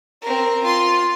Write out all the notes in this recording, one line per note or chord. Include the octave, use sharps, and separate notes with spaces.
C4 A#4
F4 C6